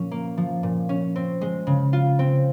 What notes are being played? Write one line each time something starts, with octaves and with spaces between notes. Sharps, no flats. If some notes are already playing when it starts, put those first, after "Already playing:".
Already playing: A#2 F3 C#4
A#3
F3
A#2
C#4
C4
G#3
C#3
F4
C4